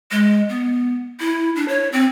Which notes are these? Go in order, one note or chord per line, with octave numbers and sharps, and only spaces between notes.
G#3
B3
E4
D4
C#5
C4